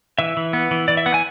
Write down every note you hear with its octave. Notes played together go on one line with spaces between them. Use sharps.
E3 E5
E3
B3
E3
E3 D5
E5
B3 F#5
G#5